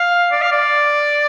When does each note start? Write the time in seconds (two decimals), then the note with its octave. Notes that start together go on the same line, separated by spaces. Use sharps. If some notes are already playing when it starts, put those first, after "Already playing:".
Already playing: F5
0.32 D5
0.42 F5
0.52 D5